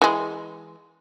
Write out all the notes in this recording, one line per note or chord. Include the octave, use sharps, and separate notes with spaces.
E3 G#3